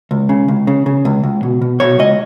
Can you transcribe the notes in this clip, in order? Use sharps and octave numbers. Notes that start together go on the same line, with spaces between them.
C#2
C#3
C#2
C#3
C#3
C#2
C#2
B2
B2
B2 C#5
C#2 D#5